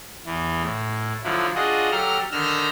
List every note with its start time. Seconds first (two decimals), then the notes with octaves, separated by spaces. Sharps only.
0.26 E2 E3
0.63 A2
1.24 D3 F3 F#3 E4
1.55 D4 F4 F#4 G#4 D#5
1.91 F#3 G4 A4 A#5 F6
2.32 D3 D#3 E6 F6 G6 A#6